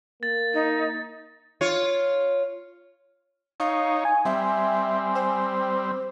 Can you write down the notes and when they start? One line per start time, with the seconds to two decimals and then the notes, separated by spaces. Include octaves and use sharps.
0.23 A#3 A6
0.54 D#4
1.61 F4 C#5
3.60 D#4 C#5 F5
4.05 G#5
4.25 G3 C4 E5
5.15 C5